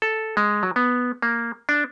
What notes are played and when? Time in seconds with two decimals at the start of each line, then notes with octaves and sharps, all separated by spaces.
0.02 A4
0.37 G#3
0.63 F#3
0.76 B3
1.22 A#3
1.69 D4